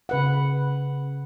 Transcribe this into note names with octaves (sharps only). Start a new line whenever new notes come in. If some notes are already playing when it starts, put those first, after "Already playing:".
C#3 B4 F#5